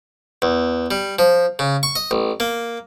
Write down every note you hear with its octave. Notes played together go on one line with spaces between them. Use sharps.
E2
G3
F3
C#3
C#6
D#5
A1
A#3